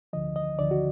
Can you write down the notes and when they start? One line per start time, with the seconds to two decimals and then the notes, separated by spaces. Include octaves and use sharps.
0.13 D2 D3 F3 D#5
0.36 D#5
0.59 D2 D3 F3 D5
0.71 F#4